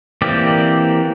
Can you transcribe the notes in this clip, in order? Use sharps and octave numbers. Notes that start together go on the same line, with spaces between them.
E3 A#3 C4 G4 D5